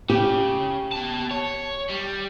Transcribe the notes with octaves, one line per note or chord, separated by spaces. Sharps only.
C#3 G4
B2 A5
C#5
G3